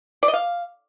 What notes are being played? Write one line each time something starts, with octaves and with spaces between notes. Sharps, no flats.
D5
D#5
F5